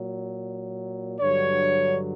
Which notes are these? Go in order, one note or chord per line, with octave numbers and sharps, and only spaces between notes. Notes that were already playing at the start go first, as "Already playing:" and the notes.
Already playing: A#2 F#3
G2 D3 F#3 C#5